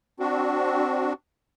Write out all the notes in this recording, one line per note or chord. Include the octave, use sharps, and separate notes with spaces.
C4 D4 F#4